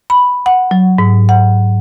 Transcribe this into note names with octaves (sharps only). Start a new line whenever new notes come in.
B5
F#5
F#3
G#2
F#5